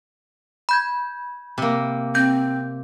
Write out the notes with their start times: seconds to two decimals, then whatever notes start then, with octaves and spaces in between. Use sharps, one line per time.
0.69 B5 G6 G#6
1.58 C3 A#3
2.15 C4 G6